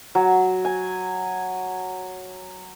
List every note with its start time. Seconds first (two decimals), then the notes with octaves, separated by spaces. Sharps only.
0.15 F#3
0.65 G#5